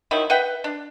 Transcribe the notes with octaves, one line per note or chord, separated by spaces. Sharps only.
D#3 F3 F#3 E4
B4 E5 F#5 G5
D4